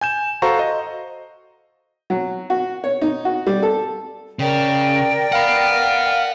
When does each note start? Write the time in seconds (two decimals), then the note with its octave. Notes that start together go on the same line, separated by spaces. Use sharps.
0.01 G#5 G6 E7
0.42 F#4 A4 C5 F5 A#5 C#6
0.59 D#5
2.10 F#3
2.50 F#4
2.84 C#5
3.01 D#4
3.25 F#4
3.47 G3
3.63 A4
4.39 C#3 A#4 D5 G5
5.32 F5 F#5 B5